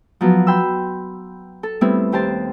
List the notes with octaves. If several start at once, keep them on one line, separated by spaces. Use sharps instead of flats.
F3 F#3 B3
G5 B5 C6 E6
A4
G3 A3 B3 C4 E4
D#2 G4 C5 A5